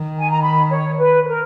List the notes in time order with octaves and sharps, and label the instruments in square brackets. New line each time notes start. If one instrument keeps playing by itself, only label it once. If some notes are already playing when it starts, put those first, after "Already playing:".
Already playing: [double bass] D#3
[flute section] G#5
A#5
B5
C#5
B4
B4
A#4